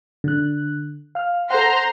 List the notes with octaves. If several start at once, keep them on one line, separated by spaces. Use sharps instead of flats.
D3 F#6
F5 F6
A4 C5 F#5 A#5 C6